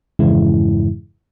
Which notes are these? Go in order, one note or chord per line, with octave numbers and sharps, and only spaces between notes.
F2 G#2 C#3 E3 G#3 E4